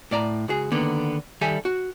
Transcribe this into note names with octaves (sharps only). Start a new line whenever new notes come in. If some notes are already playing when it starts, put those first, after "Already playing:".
A2 D5 A#5
C#2 F#4 G#4
D3 D#3 A#3 B3
D#3 G3 G4 A4 E5 G#5
F#4